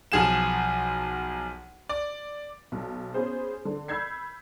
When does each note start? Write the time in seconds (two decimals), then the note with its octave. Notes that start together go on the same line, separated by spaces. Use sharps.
0.12 B1 F3 G#4 F#5 E7
1.89 D5
2.72 B1
3.14 B3 C#4 G#4 C5
3.65 D3
3.88 B5 E6 G6 G#6 C7